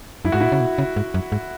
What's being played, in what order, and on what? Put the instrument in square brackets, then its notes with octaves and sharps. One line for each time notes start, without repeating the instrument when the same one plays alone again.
[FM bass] F#2 [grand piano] E4
[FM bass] G#2 [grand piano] F#4
[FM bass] A#2 [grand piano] E4
[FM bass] C#3
B2
C#3
G#2
F#2
G#2